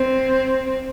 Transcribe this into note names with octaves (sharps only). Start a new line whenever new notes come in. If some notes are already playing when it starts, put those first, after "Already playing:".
Already playing: C4